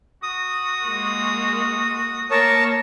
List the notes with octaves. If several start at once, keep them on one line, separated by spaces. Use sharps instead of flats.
F#4 D#6
G#3 A#3
A#3 A#4 C#5 A5